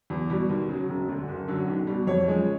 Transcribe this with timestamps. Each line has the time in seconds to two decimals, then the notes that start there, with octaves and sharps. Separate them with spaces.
0.10 E2
0.30 B2 G3
0.50 D#2
0.69 C#3 F#3
0.89 E1
1.08 D2 D3
1.28 F#1
1.48 F#2 D3 F#3
1.68 B1
1.87 B2 G3
2.07 F2 C#5
2.28 C#3 F3 G#3